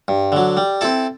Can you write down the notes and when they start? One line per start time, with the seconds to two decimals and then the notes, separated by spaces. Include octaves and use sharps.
0.08 G2
0.32 D3 F#3
0.57 G3
0.81 C4 E4 A4